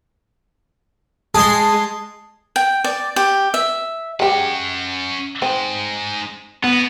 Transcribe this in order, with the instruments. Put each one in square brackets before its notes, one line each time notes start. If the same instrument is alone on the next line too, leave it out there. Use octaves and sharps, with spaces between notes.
[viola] G#3 [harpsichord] G#4 C6 [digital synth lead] A5
[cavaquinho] G5
D5
G4
E5
[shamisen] G#3 G4 [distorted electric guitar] C#4 F#5
[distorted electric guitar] G#3 D#4 [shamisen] C4
[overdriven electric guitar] B3 [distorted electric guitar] D#5 F#5